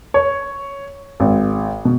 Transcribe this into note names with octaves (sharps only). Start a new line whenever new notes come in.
C#5
G#1
B2